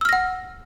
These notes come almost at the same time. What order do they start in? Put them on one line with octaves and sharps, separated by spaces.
E6 F6 A#6 F#5